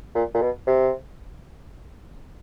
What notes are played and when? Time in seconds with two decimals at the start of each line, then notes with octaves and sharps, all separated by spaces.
0.15 A#2
0.34 A#2
0.42 B2
0.67 C3